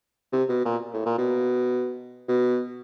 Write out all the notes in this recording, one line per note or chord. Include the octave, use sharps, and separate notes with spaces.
C3
B2
A#2
A2
A#2
B2
B2